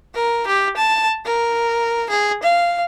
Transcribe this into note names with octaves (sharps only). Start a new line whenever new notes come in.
A#4
G4
A5
A#4
G#4
F5